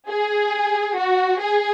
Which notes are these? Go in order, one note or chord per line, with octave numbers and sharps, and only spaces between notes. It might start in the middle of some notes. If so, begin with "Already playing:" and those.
G#4
F#4
G#4